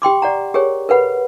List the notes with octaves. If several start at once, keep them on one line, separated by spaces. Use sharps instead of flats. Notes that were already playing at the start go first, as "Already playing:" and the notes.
G4 G5 C6 D6
D5 F#5 A#5
G4 G#4 A#4 C#5
A#4 B4 F#5 B5